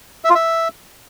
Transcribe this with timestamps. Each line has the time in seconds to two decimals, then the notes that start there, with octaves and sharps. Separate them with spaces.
0.24 E5
0.30 F4
0.35 E5